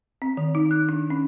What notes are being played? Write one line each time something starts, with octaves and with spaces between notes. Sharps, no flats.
C4
D#3
D#4
F#6
D4
C#4